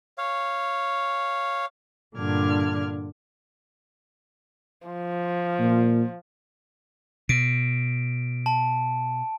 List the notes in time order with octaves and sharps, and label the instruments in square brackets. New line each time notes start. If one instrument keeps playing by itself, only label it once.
[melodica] C#5 F5
[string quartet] G2 A#2 D3 D6 F6 G#6
[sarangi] F3
[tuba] A#2
[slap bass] B2 [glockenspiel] D7
[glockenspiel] A5